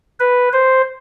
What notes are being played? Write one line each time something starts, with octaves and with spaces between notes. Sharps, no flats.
B4
C5